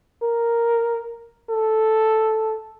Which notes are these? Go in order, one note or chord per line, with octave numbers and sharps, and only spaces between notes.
A#4
A4